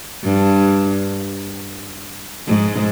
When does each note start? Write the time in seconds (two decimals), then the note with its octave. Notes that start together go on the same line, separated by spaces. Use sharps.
0.24 G2
2.47 G#2